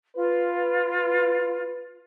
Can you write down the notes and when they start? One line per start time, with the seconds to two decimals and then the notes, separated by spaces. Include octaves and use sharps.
0.16 F4 B4